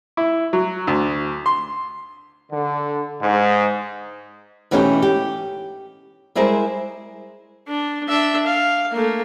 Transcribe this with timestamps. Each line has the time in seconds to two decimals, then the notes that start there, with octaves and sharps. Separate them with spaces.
0.17 E4
0.53 F#3
0.87 D2
1.46 C6
2.52 D3
3.22 G#2
4.71 B2 E3 A3 C#4 D#4 G4
5.02 G4
6.35 G3 G#3 E4 G#4 A#4 C5
7.68 D4
8.08 D4 E5
8.47 F5
8.92 A3 A#3